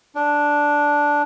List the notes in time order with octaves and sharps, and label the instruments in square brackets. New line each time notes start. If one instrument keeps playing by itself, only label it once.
[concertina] D4